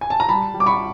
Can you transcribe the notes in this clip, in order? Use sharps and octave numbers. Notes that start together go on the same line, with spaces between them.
G#5
A5
A#5
G3 A5 B5
G3
D6
B5 C#6